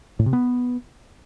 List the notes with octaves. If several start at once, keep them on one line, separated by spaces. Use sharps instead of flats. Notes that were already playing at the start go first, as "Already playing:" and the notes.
A2
C3
B3